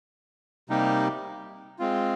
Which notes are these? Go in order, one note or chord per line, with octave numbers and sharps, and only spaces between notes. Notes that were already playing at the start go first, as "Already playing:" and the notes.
C3 G3 A#3 D#4 G4
G#3 C4 F4